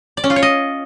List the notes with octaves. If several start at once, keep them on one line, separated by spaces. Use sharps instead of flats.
D5
C#4
F4
C#5
D#5